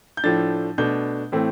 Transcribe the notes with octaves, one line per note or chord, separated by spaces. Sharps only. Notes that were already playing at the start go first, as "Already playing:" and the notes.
G6
A2 F3 A3 D4 A6
B2 A3 D4 G6
A2 E3 A3 C4